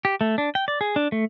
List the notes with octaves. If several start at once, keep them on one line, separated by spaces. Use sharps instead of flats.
G4
A3
D4
G5
D5
G#4
D4
A3